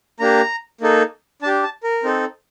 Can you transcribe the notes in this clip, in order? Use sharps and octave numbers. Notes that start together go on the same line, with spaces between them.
A#3 D4 G4 A#5
A#3 D#4 A4
D4 G4 A5
A5
A#4
C4 D#4 A4